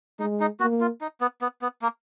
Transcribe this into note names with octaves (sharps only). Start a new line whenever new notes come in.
G#3 D#4
D#4
A#3 F#4
F4
D#4
B3
B3
B3
A#3